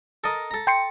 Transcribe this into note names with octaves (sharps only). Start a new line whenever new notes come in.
A4 A#4 D#5
A4 A#5
G5 C6 C#7